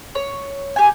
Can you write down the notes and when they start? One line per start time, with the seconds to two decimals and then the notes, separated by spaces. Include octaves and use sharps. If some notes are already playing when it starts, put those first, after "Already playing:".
0.15 C#5
0.76 G4 G#5